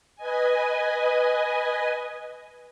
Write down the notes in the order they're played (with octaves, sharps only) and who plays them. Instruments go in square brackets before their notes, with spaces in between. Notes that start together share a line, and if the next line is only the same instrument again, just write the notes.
[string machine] B4 D#5 G#5